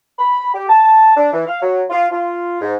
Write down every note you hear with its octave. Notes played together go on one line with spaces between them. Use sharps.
B5
G4
A5
D4
E3
F5
F#3
F4
F4
G#2